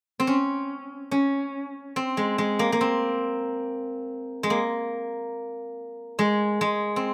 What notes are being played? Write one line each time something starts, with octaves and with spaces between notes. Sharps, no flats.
C4
C#4
C#4
C4
G#3
G#3
A#3
A#3
C4
G#3
A#3
G#3
G#3
C4